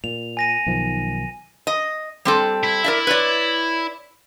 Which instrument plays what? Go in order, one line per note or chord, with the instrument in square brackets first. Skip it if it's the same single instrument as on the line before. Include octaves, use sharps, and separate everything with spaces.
[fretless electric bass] A#2 [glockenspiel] F7
[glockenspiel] G#5 A#6 D#7
[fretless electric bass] B1 D#3 F3
[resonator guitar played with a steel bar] D#5
G3 C4 A4
[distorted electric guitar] E4
[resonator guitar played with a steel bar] A#4 D5 E5
B4 C#5 D5